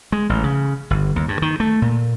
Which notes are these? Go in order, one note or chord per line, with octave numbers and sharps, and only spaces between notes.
G#3
A1
C#3
G1
D#2
G2
D#3
A3
A#2